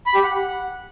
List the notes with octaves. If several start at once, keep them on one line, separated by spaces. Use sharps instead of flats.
B5
G4
F#5